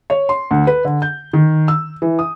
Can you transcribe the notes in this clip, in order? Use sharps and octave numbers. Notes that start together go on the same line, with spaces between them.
C#5
C6
D2
B4
D3
G6
D#3
E6
E3
D#6